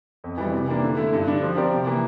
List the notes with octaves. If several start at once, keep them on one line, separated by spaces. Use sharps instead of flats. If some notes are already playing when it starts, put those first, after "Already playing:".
F2
E3 G3
C3
E3 A#3 D4
D3
A3 E4
G2
D3 G3 D4
F3
C4 G4 A#4 D5
C3
E3 A#3